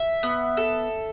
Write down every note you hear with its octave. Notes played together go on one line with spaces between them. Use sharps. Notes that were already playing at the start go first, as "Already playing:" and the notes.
Already playing: E5
B3
A4